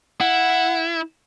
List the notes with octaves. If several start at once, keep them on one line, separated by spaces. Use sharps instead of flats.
E4 F#5